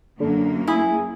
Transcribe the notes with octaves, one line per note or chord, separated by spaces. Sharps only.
F#2 D3 A#3
E4 G#4